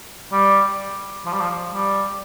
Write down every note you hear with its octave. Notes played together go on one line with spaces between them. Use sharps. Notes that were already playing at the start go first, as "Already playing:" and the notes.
G3
F3
G3
F3
G3